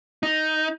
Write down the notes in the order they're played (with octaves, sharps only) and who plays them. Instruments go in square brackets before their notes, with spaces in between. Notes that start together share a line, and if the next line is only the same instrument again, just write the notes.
[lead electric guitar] D#4